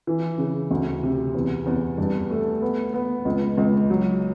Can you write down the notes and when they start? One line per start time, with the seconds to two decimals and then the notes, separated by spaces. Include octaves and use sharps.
0.07 E3
0.38 C#3
0.71 D2
1.03 C3
1.34 E2
1.66 E2
1.98 G2
2.31 A3
2.62 B3
2.94 B3
3.25 C#2
3.57 C#2
3.90 F#3